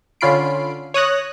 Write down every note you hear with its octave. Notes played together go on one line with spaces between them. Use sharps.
D3 C#4 F4 B5 C7 D7
C#5 D#6 F#6 A#6